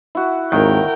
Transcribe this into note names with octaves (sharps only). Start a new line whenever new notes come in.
E4 F#4
G#1 D#2 D#3 A#4 G5